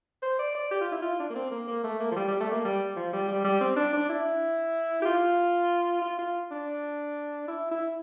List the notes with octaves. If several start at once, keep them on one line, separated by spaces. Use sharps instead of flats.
C5
D5
D5
G4
F4
E4
F4
D4
A#3
C4
A#3
A#3
A3
A#3
F3
G3
G3
A3
A#3
G3
F3
G3
G3
G3
C4
D4
D4
E4
G4
F4
F4
F4
D4
E4
E4